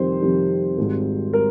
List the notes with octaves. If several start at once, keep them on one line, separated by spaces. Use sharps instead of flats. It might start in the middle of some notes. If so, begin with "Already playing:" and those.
Already playing: F2 C3 D#3 G3 C5
F2 C3 D#3 G3
G#1 G#2 G3
G3 A#4